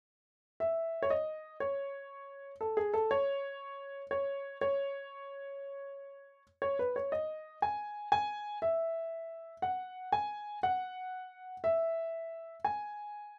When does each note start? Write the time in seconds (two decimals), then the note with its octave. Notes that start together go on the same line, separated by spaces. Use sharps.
0.60 E5
1.03 C#5
1.10 D#5
1.60 C#5
2.61 A4
2.77 G#4
2.94 A4
3.11 C#5
4.11 C#5
4.61 C#5
6.62 C#5
6.79 B4
6.96 C#5
7.12 D#5
7.62 G#5
8.12 G#5
8.62 E5
9.62 F#5
10.12 G#5
10.63 F#5
11.64 E5
12.65 G#5